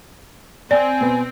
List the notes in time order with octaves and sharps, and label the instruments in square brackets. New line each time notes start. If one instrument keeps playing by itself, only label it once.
[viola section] C4 [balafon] D5 [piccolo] G#5
[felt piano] B2 B4